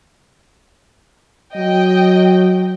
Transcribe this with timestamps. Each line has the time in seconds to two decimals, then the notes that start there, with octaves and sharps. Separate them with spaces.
1.56 F#3 D#5 G5